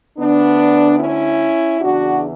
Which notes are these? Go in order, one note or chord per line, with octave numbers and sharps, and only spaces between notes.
D2 D3 B3 D4
C#4 E4
E2 C#3 E3 D4 F#4